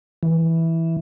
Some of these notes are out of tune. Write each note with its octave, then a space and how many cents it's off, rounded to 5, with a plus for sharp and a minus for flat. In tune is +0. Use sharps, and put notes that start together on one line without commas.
E3 -5